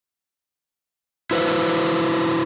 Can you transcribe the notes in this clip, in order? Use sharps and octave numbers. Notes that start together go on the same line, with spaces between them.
E4 F#4 B4 C5